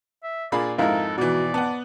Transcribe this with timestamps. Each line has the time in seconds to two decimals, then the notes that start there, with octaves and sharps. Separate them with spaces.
0.24 E5
0.52 A#2 A#3 D4 G#4 D5 B5
0.78 F2 G#2 G#3 E4 A4 A#4 F5
1.18 B2 E3 F#4 D5
1.54 B3 F#5 A5